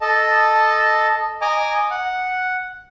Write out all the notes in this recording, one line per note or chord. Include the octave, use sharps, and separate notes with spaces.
A4 D#5 A5
D#5 G#5 A#5 D6
F#5